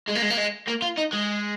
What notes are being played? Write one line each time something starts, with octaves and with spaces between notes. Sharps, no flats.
G#3
A#3
G#3
A#3
G#3
A#3
F4
D#4
G#3